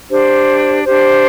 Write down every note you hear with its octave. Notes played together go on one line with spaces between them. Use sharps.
D4 G4 C5
D4 G4 C5